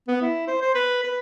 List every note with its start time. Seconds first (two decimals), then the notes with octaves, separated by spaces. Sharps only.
0.08 B3
0.22 E4
0.48 C5
0.62 C5
0.75 B4
1.04 B4